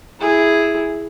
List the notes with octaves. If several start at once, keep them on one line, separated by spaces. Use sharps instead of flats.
E4 G#4